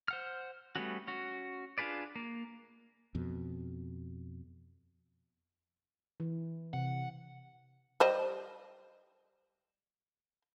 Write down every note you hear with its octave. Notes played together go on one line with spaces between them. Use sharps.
C5 F#5 F6
G3 A3 B3 C#4 F#4
C#4 F#4
D4 F4 G#4 B4 D5
A#3
F2 B2
E3
C3 F#5
G3 C5 D#5